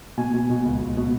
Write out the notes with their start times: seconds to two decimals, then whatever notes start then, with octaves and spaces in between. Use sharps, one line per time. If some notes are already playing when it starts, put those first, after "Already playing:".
0.17 B2 G#5
0.34 B2
0.50 B2
0.65 C#2
0.81 C#2
0.97 B2